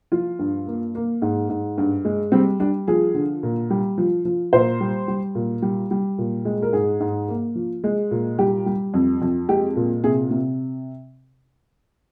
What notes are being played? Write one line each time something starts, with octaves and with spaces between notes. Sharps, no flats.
F3 F4
G2
A#3
A#3
G#2
G#2
G2
G#3
G3 C4
G3 D4
F3 G#4
D3
A#2
G3
F3
F3
A#2 C5
G3
G3
A#2
G3
G3
A#2
G#3
A#4
G#2 G#4
G#2
A#3
F3
G#3
A#2
G3 G4
G3
F2
F2
G#3 G4
A#2
C3 G#4
C3